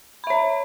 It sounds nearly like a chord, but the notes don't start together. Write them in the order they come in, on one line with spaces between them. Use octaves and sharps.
B5 E5 C#5